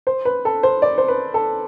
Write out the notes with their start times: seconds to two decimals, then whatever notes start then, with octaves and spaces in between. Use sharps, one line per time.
0.07 C5
0.25 B4
0.45 A4
0.63 C5
0.82 D5
0.98 C5
1.08 B4
1.34 A4